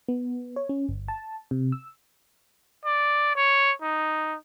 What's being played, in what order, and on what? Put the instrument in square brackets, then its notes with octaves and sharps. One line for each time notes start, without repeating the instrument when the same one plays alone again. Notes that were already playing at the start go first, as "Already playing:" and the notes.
[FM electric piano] B3
C#5
C#4
G1
A5
C3
E6
[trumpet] D5
C#5
D#4